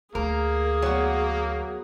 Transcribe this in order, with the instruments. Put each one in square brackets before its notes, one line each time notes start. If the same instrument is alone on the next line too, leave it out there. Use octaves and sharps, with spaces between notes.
[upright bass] D2 [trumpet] A#3 [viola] G#4 [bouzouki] A#4
[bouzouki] F#3 B3